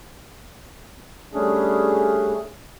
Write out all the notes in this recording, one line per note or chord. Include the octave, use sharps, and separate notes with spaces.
G3 A3 C#4 D4 G#4